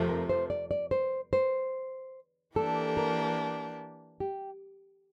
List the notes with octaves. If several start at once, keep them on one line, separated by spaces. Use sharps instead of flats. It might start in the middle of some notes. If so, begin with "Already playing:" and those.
Already playing: F2 C3 F3 A3
A#4
C5
D5
D5
C5
C5
E3 A#3 D4 G4 A4
A#4
G4